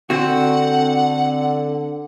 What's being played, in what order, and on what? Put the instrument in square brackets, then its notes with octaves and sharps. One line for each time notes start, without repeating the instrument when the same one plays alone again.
[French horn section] D3 [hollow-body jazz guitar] C4 F#4 [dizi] F#5